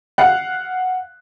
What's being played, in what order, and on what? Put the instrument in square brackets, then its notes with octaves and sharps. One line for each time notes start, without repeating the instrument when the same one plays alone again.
[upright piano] F5 F#5 F#6